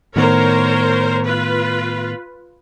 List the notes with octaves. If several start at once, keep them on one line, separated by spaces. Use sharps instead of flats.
A2 D#3 B3 A#4 C5 C#5
F4 B4